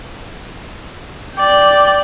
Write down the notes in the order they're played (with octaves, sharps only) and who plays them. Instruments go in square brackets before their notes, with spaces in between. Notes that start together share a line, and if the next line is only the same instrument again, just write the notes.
[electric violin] D5 G5